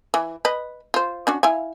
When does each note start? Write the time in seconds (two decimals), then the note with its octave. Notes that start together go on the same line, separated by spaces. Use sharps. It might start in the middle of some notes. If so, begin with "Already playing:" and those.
0.14 E3
0.45 B4 D#5
0.94 F4 C5
1.27 C#4 D4 F#4
1.43 E4 F5 G#5